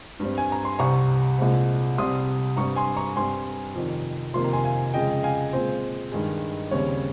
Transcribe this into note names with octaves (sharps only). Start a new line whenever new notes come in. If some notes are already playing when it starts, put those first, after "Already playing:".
G2 G3 C4
G#5
A#5
C6
C2 C3 G3 C4 A#5 C#6
C2 A#2 G#3 C4
C2 C3 G3 C4 C6 D#6
G2 G3 C4 A#5 C#6
G#5 C6
A#5 C#6
G2 G3 C4 G#5 C6
F2 C3 D#3
F2 C3 D#3 A#3 C6
A#5
G#5 C6
F5 G#5
F2 C#3 G#3 D#5 G5
F5 G#5
A#2 G#3 C4 C5
G2 D#3 G#3
D#2 C#3 G3 C4 C#5